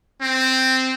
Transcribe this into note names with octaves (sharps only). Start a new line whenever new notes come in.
C4